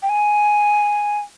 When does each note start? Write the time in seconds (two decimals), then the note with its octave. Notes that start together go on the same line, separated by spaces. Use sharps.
0.03 G5
0.09 G#5